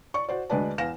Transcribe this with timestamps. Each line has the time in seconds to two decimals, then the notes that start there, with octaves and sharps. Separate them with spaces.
0.14 D5 C#6
0.29 F#4 C5 D5
0.50 D2 G#3 D4 B4 D5 A5
0.78 E2 F5 A#6 E7